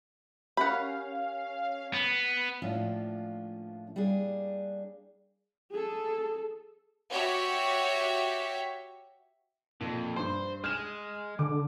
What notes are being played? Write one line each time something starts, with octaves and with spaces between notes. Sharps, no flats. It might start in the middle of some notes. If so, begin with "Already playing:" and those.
C#4 G4 A#4 F5 F#5 B5
B3
A2 F3 A#3 C#4 D4 F4
G3 A#3 D4 G#4
G#4 A4
F#4 G4 C#5 E5
F2 A#2
G2 C5 C6
G#3 F6 E7
D3 D6